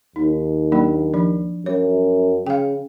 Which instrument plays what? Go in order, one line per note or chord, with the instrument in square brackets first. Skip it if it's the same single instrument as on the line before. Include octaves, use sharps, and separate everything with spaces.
[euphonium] D#2 [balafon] D#4
[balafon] F#3 A#3 D4
F3 D4
[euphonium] F#2 [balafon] C#5
[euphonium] C#3 [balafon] F5 G5